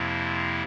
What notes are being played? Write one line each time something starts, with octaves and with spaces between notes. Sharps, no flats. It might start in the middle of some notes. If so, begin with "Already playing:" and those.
Already playing: F2 C3 F3 A#3 E4